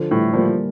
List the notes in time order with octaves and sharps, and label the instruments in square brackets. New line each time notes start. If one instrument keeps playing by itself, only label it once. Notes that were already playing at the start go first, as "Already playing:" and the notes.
Already playing: [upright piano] D3 F3
[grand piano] A2 [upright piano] E3 G3
[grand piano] F3 [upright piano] G3 A#3